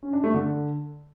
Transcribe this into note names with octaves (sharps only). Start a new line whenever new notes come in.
C#4
D4
A3
D3